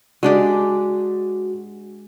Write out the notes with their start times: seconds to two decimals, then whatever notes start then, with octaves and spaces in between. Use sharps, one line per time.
0.23 G#3 D4 F#4 G4